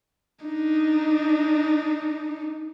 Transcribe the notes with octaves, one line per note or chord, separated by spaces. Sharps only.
D4 D#4